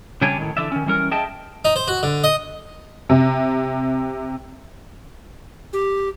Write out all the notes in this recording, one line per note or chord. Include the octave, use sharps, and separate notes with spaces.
C#3 G3 D4 C#5 G#5
A2 D#3
D3 E3 D5 E5
D#3 C#4
E3 G3 C#4 A#4
G#4 D#5 E5 G5 A5
D#4
C5
F#4
D3
D#5
C3
G4